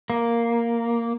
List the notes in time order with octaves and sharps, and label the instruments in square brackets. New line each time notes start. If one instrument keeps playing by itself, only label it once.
[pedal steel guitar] A#3